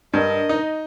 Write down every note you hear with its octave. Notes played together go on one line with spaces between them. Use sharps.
G2 D4 A#4 D#5
D#4